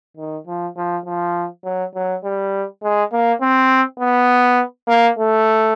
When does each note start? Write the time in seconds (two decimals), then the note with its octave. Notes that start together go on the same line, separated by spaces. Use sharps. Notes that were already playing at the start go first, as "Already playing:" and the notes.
0.17 D#3
0.47 F3
0.77 F3
1.05 F3
1.64 F#3
1.95 F#3
2.24 G3
2.83 G#3
3.13 A#3
3.41 C4
4.00 B3
4.88 A#3
5.19 A3